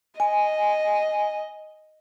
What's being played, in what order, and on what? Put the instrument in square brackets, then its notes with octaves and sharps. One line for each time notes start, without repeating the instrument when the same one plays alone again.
[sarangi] D#5 [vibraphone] G#5